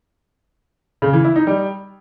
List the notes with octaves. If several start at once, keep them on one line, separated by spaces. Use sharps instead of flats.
C#3
E3
E4
D#4
G3